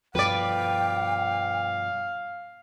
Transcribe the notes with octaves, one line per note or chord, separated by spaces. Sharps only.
G2 B2 F3 B4 D5 F5 G5